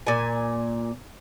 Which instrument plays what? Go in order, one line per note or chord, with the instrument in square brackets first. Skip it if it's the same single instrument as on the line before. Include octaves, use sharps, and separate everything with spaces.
[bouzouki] A#2 G#5